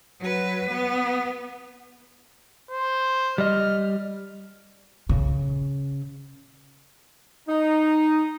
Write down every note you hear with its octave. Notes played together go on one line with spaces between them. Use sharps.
F#3 B4
B3
C5
G3 D#5 F6
C#3
D#4